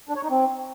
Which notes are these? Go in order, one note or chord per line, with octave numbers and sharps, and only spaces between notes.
D4
C#5
D#4
C4